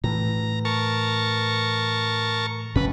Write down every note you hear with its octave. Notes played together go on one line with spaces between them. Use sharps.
A2 E3 A#5
A#4 A5 C#6
F1 G2 C#4 B4